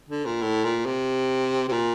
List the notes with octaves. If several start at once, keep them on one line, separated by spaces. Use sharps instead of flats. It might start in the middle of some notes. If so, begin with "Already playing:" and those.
D3
A#2
A2
A#2
C3
C3
A#2